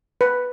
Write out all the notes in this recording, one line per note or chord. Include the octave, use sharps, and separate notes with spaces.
B4